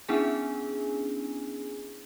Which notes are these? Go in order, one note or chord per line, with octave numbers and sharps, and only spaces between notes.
B3 C#4 D4 E4 G#4 G#5